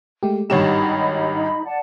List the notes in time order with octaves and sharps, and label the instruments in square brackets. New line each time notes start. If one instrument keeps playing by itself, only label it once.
[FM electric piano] G#3 A3 G4
[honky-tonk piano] G#1 G2 E7 [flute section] D#4 D#5 B5 [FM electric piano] G4 C#5
[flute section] D5 F#5 A5